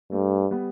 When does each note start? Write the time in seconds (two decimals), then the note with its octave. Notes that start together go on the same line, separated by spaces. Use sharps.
0.11 G2 A3
0.51 G3 B3